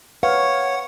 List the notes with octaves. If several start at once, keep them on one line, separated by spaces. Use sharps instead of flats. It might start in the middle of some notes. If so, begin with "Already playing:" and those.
B4 C#5 F5 F#5